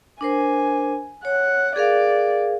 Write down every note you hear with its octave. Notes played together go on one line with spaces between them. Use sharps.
D4 A#4 C5 G#5
C#5 F#5
G#4 A#4 D5 F5